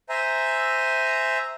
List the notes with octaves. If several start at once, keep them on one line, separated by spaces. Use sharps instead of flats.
C5 E5 G#5 A#5